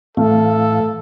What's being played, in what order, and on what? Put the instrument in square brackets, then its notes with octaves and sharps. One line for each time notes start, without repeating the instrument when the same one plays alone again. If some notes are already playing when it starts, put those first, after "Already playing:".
[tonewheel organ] A2 E3 F5 [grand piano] A3 [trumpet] A4